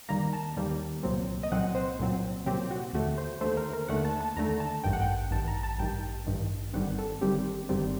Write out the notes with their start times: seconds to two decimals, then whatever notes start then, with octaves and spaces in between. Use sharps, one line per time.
0.09 D#2 D#3 G3 A#3 A#5
0.33 A5
0.57 D#2 D#3 G3 A#3
1.03 C2 A#2 F#3 C4
1.43 D#5
1.51 C2 A#2 F#3 C4 F#5
1.75 C5
1.99 C2 A#2 F#3 C4
2.46 C2 A#2 F#3 C4 G4
2.71 F#4
2.93 D#2 D3 A3 F#4
3.18 C5
3.41 D#2 D3 A3 C5
3.57 A#4
3.73 A#4
3.88 D#2 D3 A3 F#5
4.05 A5
4.21 A5
4.36 D#2 D3 A3 A#5
4.60 A5
4.84 A1 G2 D#3 G5
4.93 F#5
5.02 G5
5.31 A1 G2 D#3 A5
5.48 A#5
5.63 A5
5.79 A1 G2 D#3 G5
6.27 A1 G2 D#3
6.74 G1 G2 D#3 G3 C4 F#5
6.99 A4
7.21 G1 G2 D#3 G3 C4 G4
7.69 G1 G2 D#3 G3 C4 G4